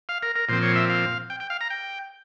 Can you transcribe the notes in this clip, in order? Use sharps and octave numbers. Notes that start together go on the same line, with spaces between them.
F5
A#4
A#4
A#2 F3 C4 C5
C#5
E5
F5
G5
G5
F5
A#5
G5